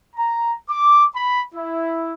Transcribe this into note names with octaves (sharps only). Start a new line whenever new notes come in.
A#5
D6
B5
E4